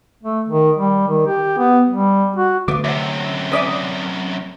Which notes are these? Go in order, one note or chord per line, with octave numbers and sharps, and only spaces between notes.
A3
D#3
G3
D#3
G4
B3
G3
F#4
D3 A3 B3 F5 D6
F#2 C3 E5 F#5
C#4 D5 E5 D6 D#6 B6